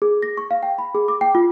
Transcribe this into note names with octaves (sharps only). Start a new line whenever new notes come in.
G#4
A#6
C#6
F5
G5
B5
G#4
D6
G5
F4